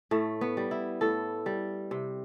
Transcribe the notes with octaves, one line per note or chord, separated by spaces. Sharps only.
A2 A3
B3
G3
E4
A2 A4
G3
C3